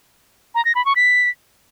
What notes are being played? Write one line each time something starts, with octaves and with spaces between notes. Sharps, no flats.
A#5
A#6
B5
C#6
B6